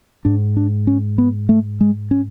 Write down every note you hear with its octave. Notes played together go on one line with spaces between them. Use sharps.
G#2 D4
D4
C#4
B3
A3
G#3
C#4